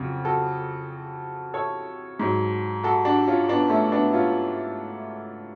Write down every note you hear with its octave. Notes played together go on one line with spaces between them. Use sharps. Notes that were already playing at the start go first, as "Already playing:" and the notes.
Already playing: F2 C#3 F#3 F#4
F#4 A4
A4 C#5
G#2 F#3
F#4 A4
D4 F#4
C#4 F4
B3 D4
A3 C#4
B3 D4
C#4 F4